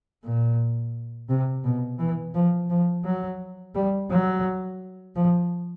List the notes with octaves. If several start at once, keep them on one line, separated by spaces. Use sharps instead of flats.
A#2
C3
B2
E3
F3
F3
F#3
G3
F#3
F3